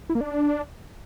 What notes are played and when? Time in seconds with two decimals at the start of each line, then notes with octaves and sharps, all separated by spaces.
0.09 E4
0.15 A#3
0.21 D4